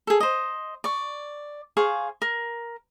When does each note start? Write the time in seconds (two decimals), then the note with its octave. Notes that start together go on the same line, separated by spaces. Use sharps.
0.07 G#4 A4
0.20 C5 D#5
0.84 D5 C#6
1.77 G#4 C5 F5 C#6
2.22 A#4